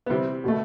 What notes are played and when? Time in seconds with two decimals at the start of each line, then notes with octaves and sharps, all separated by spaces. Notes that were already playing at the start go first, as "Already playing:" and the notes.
0.06 B3
0.10 C3 E3 G3 C4
0.44 B2 A3